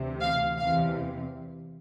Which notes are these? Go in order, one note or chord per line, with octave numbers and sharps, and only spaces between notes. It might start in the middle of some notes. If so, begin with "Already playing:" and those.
Already playing: D2 C3 E3
F5
E2 C3 E3 F5